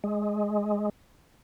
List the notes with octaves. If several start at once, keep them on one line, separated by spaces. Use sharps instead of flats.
G#3